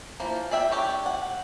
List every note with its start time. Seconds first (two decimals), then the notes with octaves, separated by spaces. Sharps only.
0.20 E3 F3 A#3
0.51 G#4 D5 E5 G5
0.71 D4 G4 C#5
1.06 F#5